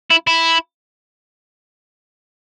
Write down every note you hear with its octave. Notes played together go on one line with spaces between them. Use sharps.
E4
E4